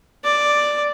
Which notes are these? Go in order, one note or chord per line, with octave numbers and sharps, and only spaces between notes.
D5